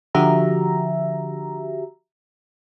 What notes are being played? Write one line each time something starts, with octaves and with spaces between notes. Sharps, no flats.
D3 F3 F#4 G4 E5 A#5